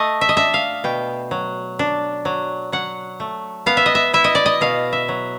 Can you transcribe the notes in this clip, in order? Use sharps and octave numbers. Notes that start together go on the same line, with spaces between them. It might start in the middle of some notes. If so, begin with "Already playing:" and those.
Already playing: A3 D#5
E5
D#5
D4 E5
F5
B2 G5
F#3
D4
F#3
F#3 F#5
A3
B3 F5
E5
D#5
E5
E4 E5
D#5
D5
D#5
B2 F5
E5
F#3